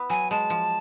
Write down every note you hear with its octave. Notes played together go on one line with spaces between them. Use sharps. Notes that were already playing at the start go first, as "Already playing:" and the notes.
Already playing: B3 E4
F#3 G#5
G#3 A5
F3